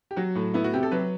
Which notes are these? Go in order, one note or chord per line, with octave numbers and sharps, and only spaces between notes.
G4
F#3 F#4
A2
B3 E4
F#4
C3 G4
A4
F#3 B4